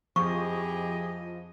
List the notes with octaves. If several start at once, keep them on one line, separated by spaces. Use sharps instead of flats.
F2 F3 E4 G4 G#4 D#5 C#6